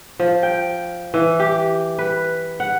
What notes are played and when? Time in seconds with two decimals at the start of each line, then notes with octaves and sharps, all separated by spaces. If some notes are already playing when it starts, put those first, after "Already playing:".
0.19 F3
0.43 G5
1.14 E3
1.40 G4
1.99 B4
2.60 F#5